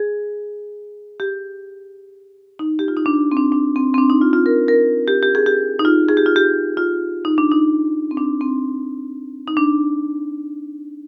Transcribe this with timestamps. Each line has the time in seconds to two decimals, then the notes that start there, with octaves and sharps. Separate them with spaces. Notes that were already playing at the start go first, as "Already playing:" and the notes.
Already playing: G#4
1.20 G4
2.59 D#4
2.79 G4
2.88 F4
2.97 D#4
3.06 D4
3.32 C4
3.37 D4
3.52 D4
3.76 C4
3.94 C4
3.98 D4
4.10 D#4
4.21 F4
4.33 F4
4.46 A#4
4.68 A#4
5.08 G4
5.23 G4
5.35 G#4
5.46 G4
5.79 D#4
5.85 F4
6.09 G#4
6.17 G4
6.26 F4
6.36 G4
6.77 F4
7.25 D#4
7.38 D4
7.52 D#4
8.11 C4
8.17 D4
8.41 C4
9.48 D#4
9.57 D4